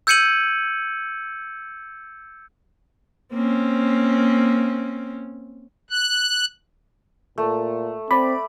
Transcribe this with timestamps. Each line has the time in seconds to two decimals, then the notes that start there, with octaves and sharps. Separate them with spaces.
0.07 E6 G6 G#6 C#7 D#7 F#7
3.33 A#3 C4 C#4
5.90 F#6
7.38 A#2 A3
8.11 C4 D5 B5